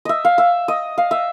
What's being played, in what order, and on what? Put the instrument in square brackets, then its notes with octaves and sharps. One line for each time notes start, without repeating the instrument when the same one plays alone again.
[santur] D#5 E5
F5
E5
D#5
F5
E5